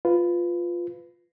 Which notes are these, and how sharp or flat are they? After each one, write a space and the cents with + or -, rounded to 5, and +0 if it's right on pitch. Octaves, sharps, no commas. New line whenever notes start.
F4 +0 B4 +15